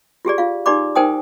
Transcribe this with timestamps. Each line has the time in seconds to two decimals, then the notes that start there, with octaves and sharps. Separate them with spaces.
0.25 F4 G4 G#4 D5
0.38 F4 F5
0.66 D#4 G4 D5 B5 D6
0.95 D#4 A#4 C5 G5 G#5 D#6